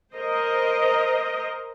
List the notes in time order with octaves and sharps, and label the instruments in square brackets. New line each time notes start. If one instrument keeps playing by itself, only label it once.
[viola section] A#4 C5 D#5